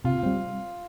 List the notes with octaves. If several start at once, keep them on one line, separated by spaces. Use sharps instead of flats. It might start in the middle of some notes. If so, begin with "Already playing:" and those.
C3 F4
G3 C4